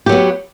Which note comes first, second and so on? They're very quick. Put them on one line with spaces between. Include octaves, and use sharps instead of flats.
G4 F#3 B3